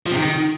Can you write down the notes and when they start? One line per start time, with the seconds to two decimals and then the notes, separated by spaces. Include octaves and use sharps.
0.06 F3
0.11 C3
0.17 D#3